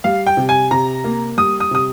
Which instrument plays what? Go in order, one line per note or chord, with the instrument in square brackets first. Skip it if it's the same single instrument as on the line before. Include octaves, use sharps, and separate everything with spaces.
[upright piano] G3 [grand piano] F5
[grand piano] G5
[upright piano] C3
[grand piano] G#5
[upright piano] C3 [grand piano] A#5
[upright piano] A#3
[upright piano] G3 [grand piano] D#6
[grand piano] D#6
[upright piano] C3 [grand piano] D#6